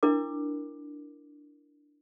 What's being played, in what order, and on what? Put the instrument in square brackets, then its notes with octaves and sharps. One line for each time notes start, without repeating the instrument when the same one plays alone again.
[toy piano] D4 E4 A#4 D6